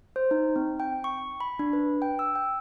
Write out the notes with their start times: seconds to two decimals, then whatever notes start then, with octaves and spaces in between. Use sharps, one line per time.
0.16 C5
0.31 D#4
0.56 C4
0.80 G5
1.04 C#6
1.40 B5
1.59 D4
1.73 B4
2.02 G5
2.19 E6
2.35 G5